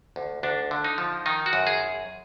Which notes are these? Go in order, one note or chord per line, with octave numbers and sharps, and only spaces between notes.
D2
D2 D4
D3
D#4
F3
D#3 D#4
F#4
F#2
G#4